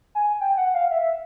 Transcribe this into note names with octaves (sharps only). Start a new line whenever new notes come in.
G#5
G5
F#5
F5
E5